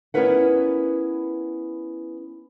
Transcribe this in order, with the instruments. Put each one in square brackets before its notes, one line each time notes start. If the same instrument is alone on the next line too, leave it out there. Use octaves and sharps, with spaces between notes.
[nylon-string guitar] B3 C#4 E4 A#4 B4 F#5